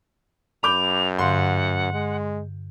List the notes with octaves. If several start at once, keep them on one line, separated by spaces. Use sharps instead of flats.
F#2 B5 D6 G6 F7
G2 D3 F5 F#5 C6
G#3